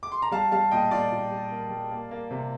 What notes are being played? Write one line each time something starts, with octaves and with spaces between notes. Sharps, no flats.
D6
C6
A#5
G3 F5 A5
G3 F5 A5
A#2 D#5 G5
A#2 D5 F5
A#2
G3
A#3
G3
A#3
A#3
C3